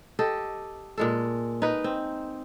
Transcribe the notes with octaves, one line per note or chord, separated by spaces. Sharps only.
G4 A4 D#5
A#2 G#3 A4
D#4 B4
C4